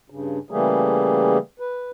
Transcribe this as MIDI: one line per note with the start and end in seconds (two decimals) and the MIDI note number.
0.10 0.39 43
0.10 0.39 49
0.51 1.38 49
0.51 1.38 52
0.51 1.38 55
0.51 1.38 57
0.51 1.38 58
0.51 1.38 68
1.60 1.91 71